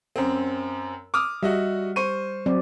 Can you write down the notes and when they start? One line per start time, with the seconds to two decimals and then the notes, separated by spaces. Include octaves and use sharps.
0.16 F#2 C4
1.14 D6 D#6 F6
1.43 G3 F#4 D#5 E5
1.96 C5 C#6 D#7
2.46 F#3 C4 D5